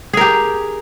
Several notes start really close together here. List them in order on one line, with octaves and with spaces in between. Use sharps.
G#4 A#4 G4